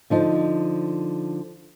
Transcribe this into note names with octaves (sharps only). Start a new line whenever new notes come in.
D3 F3 D#4